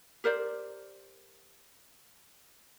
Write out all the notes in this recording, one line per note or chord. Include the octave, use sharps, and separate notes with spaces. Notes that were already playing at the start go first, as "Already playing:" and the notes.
G4 A#4 C5 D5